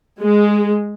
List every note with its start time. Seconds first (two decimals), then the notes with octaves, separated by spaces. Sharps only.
0.22 G#3